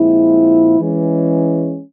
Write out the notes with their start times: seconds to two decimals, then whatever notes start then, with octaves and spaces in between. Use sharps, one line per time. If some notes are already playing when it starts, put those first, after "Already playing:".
Already playing: A#2 F3 G#3 C4 E4
0.78 E3 G#3 C#4